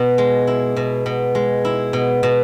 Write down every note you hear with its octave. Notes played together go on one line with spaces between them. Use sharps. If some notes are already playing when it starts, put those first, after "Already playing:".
Already playing: B2
G#3
E4
B2
B2
G#3
E4
B2
B2